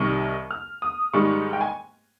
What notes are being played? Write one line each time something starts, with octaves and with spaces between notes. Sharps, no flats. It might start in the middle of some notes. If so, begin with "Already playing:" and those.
Already playing: C2 C3 D#3 G3 C#6
F6
D#6
G#2 D#3 G3 C#6
G5
G#5